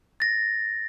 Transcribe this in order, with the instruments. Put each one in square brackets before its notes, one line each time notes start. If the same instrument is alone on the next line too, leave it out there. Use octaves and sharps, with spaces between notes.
[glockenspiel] A6 A#6